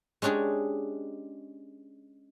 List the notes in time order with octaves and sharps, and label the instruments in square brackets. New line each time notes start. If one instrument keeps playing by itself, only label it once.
[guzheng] G#3 C#4 D4 G4 G#4